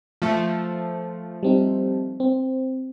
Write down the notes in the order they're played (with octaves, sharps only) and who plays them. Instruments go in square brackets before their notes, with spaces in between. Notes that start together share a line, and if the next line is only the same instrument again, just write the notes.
[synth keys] F3 A3
[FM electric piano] G3 C4 D#4
C4